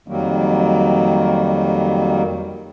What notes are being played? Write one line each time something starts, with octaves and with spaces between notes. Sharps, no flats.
F2 D#3 F#3 G3 A#3